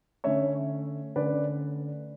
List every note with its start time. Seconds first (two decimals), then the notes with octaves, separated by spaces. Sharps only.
0.24 D3 A3 C#4 C#5 E5
1.16 D3 A3 C#4 B4 D5